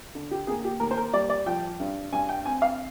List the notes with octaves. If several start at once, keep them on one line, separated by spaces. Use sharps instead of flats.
D3
G4
A#3 G#4
G4
D#2 A#4
C5
A#4
G3 D5
D5
F3 G5
G2
G2 G#5
G5
C4 G#5
F5